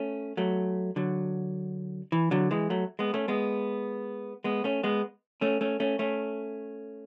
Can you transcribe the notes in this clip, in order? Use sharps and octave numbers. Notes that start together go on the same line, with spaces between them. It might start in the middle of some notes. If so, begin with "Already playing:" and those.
Already playing: A3 C#4
F#3 A3
D3 F#3
E3
D3 F#3
E3 G#3
F#3 A3
G#3 B3
A3 C#4
G#3 B3
G#3 B3
A3 C#4
G#3 B3
A3 C#4
A3 C#4
A3 C#4
A3 C#4